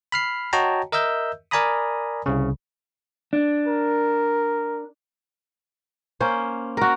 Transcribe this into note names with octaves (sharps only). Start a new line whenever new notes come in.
B5 F6 C7
F#4 C#5 D#5 G5 A5 A#5
A#4 D#5 E5 E6 G6
A#4 D5 G#5 A#5 B5 D#6
C2 C#3
D4
A#4
A#3 C#4 C5
F#4 A#4